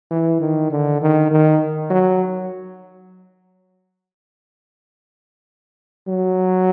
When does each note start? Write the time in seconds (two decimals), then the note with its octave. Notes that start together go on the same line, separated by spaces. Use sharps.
0.11 E3
0.41 D#3
0.71 D3
1.01 D#3
1.31 D#3
1.90 F#3
6.08 F#3